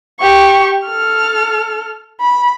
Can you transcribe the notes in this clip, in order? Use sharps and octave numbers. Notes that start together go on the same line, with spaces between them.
G4 C#6
A4 F6
B5